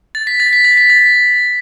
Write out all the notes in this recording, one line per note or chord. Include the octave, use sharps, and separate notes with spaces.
A6
B6
A6
B6
A6
B6
A6